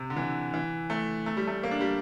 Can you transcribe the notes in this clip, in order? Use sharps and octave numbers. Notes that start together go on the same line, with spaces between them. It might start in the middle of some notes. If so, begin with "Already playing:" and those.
Already playing: C3
D3
E3
E3
A3
A3
G3
A3
A#3
D4
G3